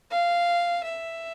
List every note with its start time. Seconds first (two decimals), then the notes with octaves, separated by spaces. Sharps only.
0.11 F5
0.83 E5